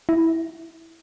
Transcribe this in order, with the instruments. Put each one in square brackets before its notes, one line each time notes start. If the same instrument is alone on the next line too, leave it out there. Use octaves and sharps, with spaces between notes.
[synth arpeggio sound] E4